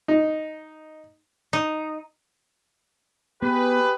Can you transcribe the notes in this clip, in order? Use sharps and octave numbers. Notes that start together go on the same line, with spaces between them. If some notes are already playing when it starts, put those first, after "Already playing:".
D#4
D#4
B3 G4 G#4 B4